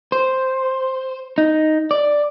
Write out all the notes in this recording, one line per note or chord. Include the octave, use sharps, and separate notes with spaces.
C5
D#4
D5